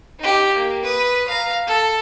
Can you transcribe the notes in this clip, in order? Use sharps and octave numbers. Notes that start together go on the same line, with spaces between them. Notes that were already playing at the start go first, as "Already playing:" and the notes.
D#4 G4
A#3
B4 D#6
F5 A#5
A4